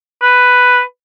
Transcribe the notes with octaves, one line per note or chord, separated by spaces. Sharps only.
B4